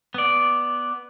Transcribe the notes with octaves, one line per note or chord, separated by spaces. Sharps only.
B3 D5